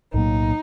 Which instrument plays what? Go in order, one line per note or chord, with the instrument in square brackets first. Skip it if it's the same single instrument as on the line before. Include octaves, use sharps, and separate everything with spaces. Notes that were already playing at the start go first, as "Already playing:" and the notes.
[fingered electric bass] B1 A2 F#3 A#3 [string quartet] D#4